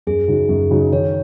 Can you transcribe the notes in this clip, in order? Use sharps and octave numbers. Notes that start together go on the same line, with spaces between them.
F#2 G#4
C#3 F#3 D#4 F#4
F#2
C#3 F#3 D#4 F#4
D#3 C#5